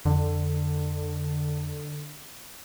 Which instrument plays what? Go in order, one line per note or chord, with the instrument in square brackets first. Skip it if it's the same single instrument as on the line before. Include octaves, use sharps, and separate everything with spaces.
[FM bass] F2 [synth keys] D3